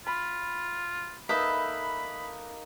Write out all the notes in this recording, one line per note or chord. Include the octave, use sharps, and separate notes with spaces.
F4 B5
A#3 D#4 A4 B4 E5 B5